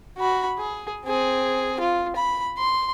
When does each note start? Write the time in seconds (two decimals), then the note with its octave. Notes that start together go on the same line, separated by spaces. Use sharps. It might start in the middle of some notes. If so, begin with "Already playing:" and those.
0.18 F#4 B5
0.58 G#4
1.05 C4 G#4
1.80 F4
2.16 B5
2.59 C6